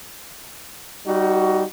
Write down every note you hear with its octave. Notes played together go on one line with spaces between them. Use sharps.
G3 D#4 F#4